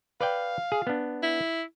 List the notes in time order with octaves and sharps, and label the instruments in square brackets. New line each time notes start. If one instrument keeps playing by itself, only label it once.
[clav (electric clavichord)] B4 D5 G5 [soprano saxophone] F5
[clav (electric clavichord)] G#4
B3 D4
[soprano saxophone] E4